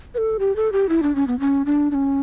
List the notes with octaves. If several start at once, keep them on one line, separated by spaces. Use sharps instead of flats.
B4
A4
G4
A4
G4
E4
D4
C#4
B3
C#4
D4
D4
C#4